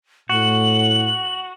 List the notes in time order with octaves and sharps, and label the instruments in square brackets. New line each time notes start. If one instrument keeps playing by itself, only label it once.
[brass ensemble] A2 [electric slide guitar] F#4 [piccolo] F#7